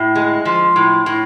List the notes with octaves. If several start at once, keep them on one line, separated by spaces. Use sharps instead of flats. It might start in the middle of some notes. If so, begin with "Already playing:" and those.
Already playing: A2
G#3
F3
A2
A2